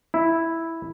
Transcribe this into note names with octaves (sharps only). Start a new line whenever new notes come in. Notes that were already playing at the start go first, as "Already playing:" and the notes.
E4